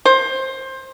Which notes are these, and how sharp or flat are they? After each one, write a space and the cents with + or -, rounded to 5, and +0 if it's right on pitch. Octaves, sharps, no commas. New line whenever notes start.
C5 +20